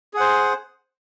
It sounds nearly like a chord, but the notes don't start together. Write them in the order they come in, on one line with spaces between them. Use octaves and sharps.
G#4 F#5 C5